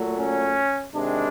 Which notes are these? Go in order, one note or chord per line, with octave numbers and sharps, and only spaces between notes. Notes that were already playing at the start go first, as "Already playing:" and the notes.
Already playing: A#2 F#3 A3
C#4
C3 D#3 G#3 D4